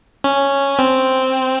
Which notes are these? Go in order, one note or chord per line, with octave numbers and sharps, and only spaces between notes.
C#4
C4